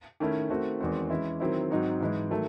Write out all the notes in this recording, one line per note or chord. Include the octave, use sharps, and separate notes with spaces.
D#3 A3 C#4 E4
D#3 A3 C4 F#4
E2 D#3 G#3 C4 F#4
E3 G#3 C#4 E4
D#3 F#3 C4 E4
G#2 F#3 C4 D#4 F#4
G#2 E3 G#3
D#3 F#3 A3